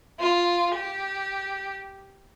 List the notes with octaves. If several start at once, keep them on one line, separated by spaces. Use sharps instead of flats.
F4
G4